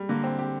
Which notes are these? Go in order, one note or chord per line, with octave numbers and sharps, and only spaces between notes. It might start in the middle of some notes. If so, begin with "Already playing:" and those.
Already playing: G3
D3 A#3
C4
G4